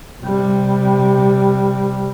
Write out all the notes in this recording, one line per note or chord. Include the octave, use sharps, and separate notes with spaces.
C3 G3